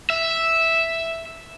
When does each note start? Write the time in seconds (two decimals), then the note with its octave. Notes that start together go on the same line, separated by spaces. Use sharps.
0.10 E5